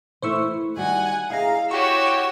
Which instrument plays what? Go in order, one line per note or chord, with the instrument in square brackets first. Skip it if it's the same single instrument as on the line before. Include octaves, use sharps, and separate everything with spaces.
[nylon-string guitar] E3 A3 E4 [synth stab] C5 C#6 E6
[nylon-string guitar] D#3 G3 F#4 [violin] F#5 G#5
[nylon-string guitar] E4 D#5 [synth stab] G#4 A#5 [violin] F5
[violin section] F#4 G4 C#5 [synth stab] C#6 [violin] E6